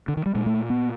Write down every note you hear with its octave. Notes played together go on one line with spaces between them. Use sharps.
D3
D#3
G3
A#2 G#3
A3
B3